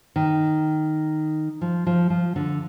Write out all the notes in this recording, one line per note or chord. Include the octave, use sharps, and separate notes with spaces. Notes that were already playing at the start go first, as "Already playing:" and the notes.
D#3
F3
F3
F3
D3